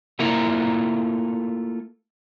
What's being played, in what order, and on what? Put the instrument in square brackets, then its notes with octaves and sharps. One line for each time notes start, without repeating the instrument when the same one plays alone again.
[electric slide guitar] A3 A#3 E4 F4 A#4 A#5